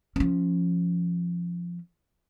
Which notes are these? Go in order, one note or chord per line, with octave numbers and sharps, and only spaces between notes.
F3 C#4